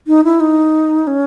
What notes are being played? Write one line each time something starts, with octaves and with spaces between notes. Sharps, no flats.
D#4
E4
D#4
C#4